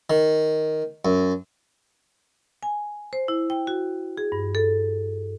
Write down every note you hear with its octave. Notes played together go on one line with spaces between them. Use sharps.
D#3
F#2
G#5
C5
E4
G5
F#4
G#4
G2
A4